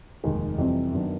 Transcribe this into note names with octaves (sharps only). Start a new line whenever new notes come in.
F1 D#2 D#3 G#3
F2 C3 E3 G3 C4
F#2 D#3 F#3 B3 D4